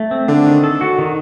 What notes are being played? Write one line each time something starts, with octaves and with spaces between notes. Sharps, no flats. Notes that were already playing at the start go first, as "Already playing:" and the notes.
Already playing: A3
C4
D3 D4
D#3
A4
F#4
D#3